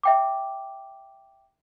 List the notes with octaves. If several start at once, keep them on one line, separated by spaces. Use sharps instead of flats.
E5 G5 D6